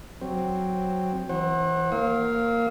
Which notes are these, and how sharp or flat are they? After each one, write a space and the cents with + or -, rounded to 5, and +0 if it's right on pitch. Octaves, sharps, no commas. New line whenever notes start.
F#3 +0 C4 +0
E3 +0 C5 +40 F#5 +0
A#3 -5 F5 +0 E6 -45